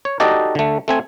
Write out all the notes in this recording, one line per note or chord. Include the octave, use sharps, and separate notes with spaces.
C#5
D#4 F#4 G4 A4 D5 D#5
D3 A3
A3 C4 G#5